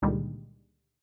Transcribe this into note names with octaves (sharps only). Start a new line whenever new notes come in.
C#2 A#2 D3 D#3 G3 G#3